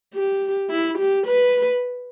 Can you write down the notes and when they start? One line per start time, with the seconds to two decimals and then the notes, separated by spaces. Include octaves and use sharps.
0.14 G4
0.70 E4
0.98 G4
1.27 B4